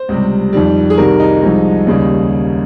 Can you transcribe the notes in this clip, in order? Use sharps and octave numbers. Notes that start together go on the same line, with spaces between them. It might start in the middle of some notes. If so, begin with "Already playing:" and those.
Already playing: C5
C#2 C3 G3
F2 D#3 G3
G#4
C2 C3 D#3 G3 A#4
D#4
C2 C3 F3 G#3
D#2 C#3 G3